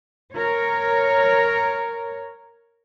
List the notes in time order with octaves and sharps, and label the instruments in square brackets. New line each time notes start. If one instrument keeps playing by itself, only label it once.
[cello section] A#4 C#5